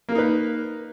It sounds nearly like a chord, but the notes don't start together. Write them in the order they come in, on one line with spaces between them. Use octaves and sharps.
A#3 A#4 D#4 B4